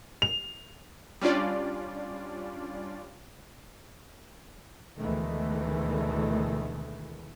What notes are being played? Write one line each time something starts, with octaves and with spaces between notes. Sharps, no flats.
F7
G3 C#4 D4 F4 D5
D2 B2 D#3 E3 G#3 A3